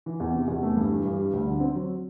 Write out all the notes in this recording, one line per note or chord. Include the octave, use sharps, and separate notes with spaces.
E3
E2
C3
E2
A3
G2
E3
G2
G3
D2
D3
C4
F#3